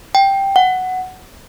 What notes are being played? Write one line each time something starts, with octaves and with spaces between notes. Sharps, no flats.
G5
F#5